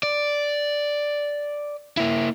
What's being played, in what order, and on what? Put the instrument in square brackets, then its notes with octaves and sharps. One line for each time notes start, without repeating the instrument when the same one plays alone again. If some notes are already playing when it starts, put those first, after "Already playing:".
[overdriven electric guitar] D5
A#3 E4